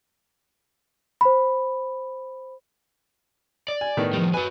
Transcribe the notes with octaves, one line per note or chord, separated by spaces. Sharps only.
C5 B5
D5
G#5
A2 D#3 B3
F3 G3
F#4 B4 G#5